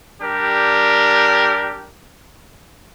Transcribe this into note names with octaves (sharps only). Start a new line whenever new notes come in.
G3 D4 G4 A#4